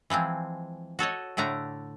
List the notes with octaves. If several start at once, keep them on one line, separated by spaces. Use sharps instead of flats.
E3 F3 G#3 C4
F#4 A4 C#5 D#5
A2 D3 A3 D4 A#5